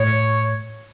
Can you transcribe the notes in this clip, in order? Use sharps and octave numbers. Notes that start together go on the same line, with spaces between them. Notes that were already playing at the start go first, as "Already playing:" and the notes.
Already playing: A2 C#5